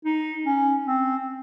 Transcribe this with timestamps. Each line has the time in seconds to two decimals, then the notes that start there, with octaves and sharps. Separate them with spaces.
0.05 D#4
0.46 C#4
0.87 C4